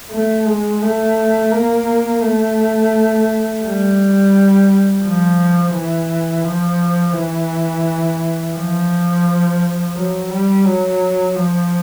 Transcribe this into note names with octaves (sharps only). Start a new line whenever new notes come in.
A3
G#3
A3
A#3
A3
G3
F3
E3
F3
E3
F3
F#3
G3
F#3
F3